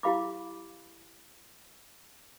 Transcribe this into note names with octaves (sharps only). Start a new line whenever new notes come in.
E4 G4 F5 B5 D6